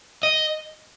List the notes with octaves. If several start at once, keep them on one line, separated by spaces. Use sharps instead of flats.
D#5